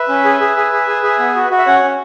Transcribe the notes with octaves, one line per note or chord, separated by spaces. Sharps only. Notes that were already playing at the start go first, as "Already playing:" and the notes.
Already playing: B4 E5
C#4
G#4
G#4
G#4
G#4
G#4
G#4
B3
F#4
F#4
E5
C#4 C#5 F#5
C#4